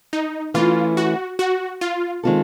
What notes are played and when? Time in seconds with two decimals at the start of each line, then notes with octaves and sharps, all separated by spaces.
0.13 D#4
0.54 E3 A3 C#4 E4 F4
0.97 F#4
1.39 F#4
1.81 F4
2.23 D#3 G#3 C4 F4 A4